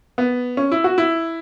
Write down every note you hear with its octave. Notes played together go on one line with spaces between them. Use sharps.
B3
C#4
E4
F#4
E4